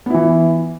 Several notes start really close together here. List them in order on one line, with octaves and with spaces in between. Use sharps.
B3 E4 E3